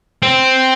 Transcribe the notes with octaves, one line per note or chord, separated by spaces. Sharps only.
C4